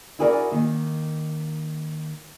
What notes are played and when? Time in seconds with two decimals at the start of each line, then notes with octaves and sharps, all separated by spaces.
0.19 E4 F#4 G#4 A#4 C5 D5
0.51 D#3 A#3